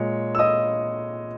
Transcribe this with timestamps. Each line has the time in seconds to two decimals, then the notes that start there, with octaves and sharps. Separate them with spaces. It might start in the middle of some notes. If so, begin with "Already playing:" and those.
Already playing: A#2 G#3 C#5
0.35 E6
0.39 D#5 D#6